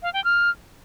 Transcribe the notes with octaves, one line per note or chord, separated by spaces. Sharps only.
F5
G5
F6